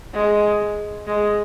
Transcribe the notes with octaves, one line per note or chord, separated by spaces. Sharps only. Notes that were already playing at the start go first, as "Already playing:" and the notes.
G#3
G#3